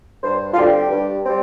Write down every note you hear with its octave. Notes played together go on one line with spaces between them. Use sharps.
G2 C5
F4
D3 G3 C4 G4
G2
G3 C4